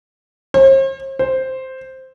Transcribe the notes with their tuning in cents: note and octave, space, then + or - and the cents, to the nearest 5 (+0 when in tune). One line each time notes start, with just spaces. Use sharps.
C5 +45
C5 +0